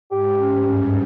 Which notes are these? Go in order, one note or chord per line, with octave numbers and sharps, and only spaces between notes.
G#2 G4
C#4
G2 C#4